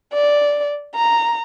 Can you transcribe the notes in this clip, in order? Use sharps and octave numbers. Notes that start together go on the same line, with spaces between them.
D5
A#5